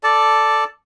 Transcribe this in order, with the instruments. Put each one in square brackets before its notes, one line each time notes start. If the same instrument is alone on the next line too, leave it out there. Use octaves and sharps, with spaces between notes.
[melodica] A4 D5 A5